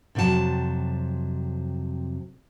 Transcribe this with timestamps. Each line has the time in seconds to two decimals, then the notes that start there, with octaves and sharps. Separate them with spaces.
0.15 F2 C3 F#3 F4 A5